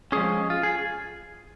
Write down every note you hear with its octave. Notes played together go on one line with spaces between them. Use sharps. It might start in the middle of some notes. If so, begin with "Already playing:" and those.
F3 G#3 C#4 G#4
F4
G#4